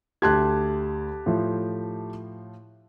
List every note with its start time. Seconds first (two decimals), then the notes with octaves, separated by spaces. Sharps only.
0.22 D2 G4 A5 C6 F#6 G#6
1.26 A2 F3